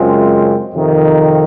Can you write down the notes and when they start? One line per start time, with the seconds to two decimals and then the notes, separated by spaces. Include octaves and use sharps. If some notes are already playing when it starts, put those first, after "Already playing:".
Already playing: F#2 C#3 G#3 C4 F4
0.74 F2 C3 D#3